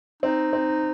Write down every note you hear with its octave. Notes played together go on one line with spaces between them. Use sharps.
C4 D#4
C4